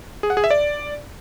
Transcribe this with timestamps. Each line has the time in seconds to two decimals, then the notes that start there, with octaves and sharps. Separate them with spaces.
0.23 G#4
0.30 F#5
0.37 G#4
0.44 E5
0.51 D5